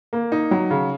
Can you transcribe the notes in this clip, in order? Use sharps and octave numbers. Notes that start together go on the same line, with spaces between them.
A#3
D#4
F#3
C#3